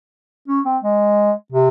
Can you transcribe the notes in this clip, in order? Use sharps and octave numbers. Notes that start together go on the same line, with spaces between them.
C#4
C4
G#3
C3